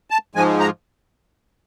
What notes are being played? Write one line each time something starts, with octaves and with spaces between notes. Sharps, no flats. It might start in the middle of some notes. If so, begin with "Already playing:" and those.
A5
G#2 F3 G#3 G#5
A#5